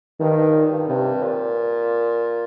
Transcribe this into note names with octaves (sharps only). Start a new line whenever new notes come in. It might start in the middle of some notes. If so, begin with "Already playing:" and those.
G2 D#3
G2
A#2
G2
G2 C3
A#2